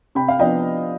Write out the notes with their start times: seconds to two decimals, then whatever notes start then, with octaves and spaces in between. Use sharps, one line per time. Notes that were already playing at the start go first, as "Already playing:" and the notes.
0.15 C3 G5 B5
0.28 F5
0.39 F3 B3 D4 D#5 G5